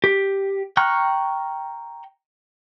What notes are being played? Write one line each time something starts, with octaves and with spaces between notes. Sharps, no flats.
G4
G5 A#5 C#6 F6 F#6